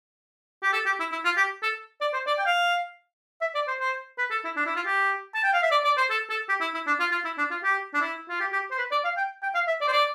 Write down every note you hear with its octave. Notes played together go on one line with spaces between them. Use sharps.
G4
A4
G4
E4
E4
F4
G4
A4
D5
C5
D5
G5
F5
E5
D5
C5
C5
B4
A4
E4
D4
E4
F4
G4
A5
G5
F5
E5
D5
D5
C5
A4
A4
G4
E4
E4
D4
F4
F4
E4
D4
F4
G4
D4
E4
F4
G4
G4
C5
B4
D5
F5
G5
G5
F5
E5
D5
C5
D5